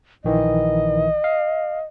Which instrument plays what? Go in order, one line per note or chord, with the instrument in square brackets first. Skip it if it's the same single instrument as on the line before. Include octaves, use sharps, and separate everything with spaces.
[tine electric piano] A#1 D#3 E3 [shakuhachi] D#5
[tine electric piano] F5